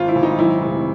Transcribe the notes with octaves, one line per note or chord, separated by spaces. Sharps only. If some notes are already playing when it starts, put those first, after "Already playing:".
Already playing: G#1 F4
E4
G#1
D#4
F#3 E4
F1